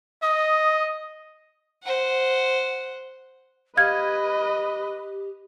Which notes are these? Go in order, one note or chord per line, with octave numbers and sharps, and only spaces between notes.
D#5 D#6
C5 F#5
G4 B4 D#5 F5 F6 G#6